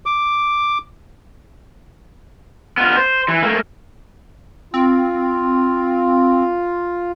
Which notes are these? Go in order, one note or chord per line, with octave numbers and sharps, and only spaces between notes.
D6
B3 F4
C5
E3
A3 A#3
C4 F4